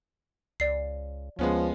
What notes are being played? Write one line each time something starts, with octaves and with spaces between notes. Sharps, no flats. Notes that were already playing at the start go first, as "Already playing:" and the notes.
C#2 D5 C7
D2 F3 G#3 B3 C#4